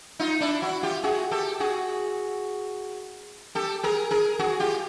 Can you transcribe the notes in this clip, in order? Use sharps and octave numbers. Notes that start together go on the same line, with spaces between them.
D#4 F4
D4 E4
E4 F#4
F4 G4
F#4 G#4
G4 A4
F#4 G#4
G4 A4
G#4 A#4
G#4 A#4
F#4 G#4
F4 G4